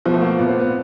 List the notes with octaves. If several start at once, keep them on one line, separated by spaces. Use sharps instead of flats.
B2 F3
A3
A#3
A#2 B3
C4
B3